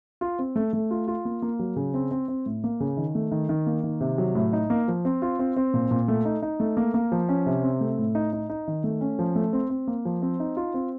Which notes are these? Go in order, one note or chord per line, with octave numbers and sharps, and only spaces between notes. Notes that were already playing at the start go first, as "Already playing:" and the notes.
F4
C4
A3
A3
F4
F4
A#3
A#3
F#3
C#3
C4
C4
C4
A2
A#3
C#3
D#3
A3
D#3
D#3
A#3
D#3
C3
F#3
A2
D#4
A#3
F3
C4
F4
C4
C4
A#2
A#2
A3
D#4
D#4
A3
A#3
A#3
F3
C#4
C3
C4
A3
A2
D#4
D#4
D#4
D#3
A3
C#4
F3
A3
C4
C4
A#3
F3
C4
D#4
F4
C4